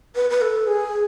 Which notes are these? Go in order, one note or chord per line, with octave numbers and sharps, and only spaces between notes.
B4
B4
A4
G#4